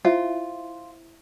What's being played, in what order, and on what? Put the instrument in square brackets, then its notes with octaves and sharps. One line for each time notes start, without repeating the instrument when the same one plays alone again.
[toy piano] E4 C5 E5 [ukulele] F4